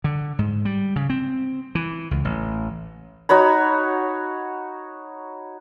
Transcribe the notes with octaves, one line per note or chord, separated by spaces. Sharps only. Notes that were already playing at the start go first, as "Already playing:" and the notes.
D3
G#2
G3
C#3
C4
E3
C#2
A1
D#4 F#4 C#5 B5